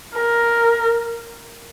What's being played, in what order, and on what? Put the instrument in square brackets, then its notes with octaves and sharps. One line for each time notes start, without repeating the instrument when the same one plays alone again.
[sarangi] A#4